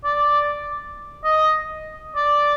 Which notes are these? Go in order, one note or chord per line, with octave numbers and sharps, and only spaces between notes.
D5
D#5
D5